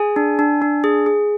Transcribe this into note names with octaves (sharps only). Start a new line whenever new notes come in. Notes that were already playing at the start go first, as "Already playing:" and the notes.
Already playing: G#4 G#5
D4
D4
D4
G#4
G#4